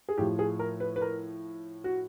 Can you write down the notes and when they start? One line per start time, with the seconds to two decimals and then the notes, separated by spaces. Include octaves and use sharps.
0.09 G#4
0.17 A2 F3 G4
0.39 G#4
0.59 A#4
0.80 B4
0.96 B4
1.02 A#4
1.84 F#4